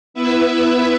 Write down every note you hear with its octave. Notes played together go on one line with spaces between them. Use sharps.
B3 E4 B4 E5